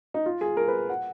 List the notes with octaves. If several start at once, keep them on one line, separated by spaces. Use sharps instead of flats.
D#4
F4
G#4
A#4
B4
F#5